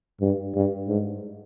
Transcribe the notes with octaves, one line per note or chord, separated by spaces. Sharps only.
G2
G2
G#2